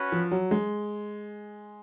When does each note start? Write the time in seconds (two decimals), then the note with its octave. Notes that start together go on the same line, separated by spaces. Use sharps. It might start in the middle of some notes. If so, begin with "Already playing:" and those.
Already playing: C#4 F#4 B4
0.12 F3
0.31 F#3
0.51 G#3